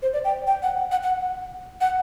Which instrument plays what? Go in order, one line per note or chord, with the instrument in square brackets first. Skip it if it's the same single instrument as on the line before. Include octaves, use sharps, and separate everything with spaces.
[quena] C5
D5
G5
G5
F#5
F#5
F#5
F#5